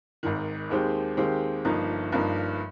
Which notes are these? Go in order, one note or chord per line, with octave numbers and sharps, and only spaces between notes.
G#1 G#2 D#3
D#2 D#3 G#3 C4 G4
D#2 D#3 G#3 C4 G4
G1 G2 F3 A#3 D#4
G1 G2 F3 A#3 D#4